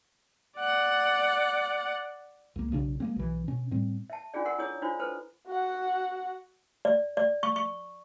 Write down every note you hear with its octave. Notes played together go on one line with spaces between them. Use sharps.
D5 F#5
C#2 A#3
B1 C#3 D4
G#3 A#3 C4
B1 E3
B2 C#4
A2 G3 C4
E5 A5
C#4 D4 F4 G#4 D5
A#4 F#5 C6
E4 G#4 A4 C#5 D#6
D4 E4 F4 C5
A4 B4 C5
F#4 F#5
D5
D5
C#6
C#6